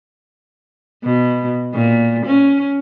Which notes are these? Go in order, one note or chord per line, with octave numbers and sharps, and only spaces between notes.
B2
A#2
C#4